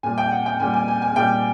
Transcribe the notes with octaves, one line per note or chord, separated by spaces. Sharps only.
A#2 G3 G#5
G5
F#5
G5
A#2 G3 G#5
G#5
G#5
G#5
A#2 G3 G5